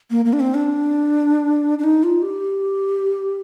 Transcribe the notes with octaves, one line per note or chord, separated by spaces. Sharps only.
A#3
A#3
D4
C4
D4
D4
D#4
F4
G4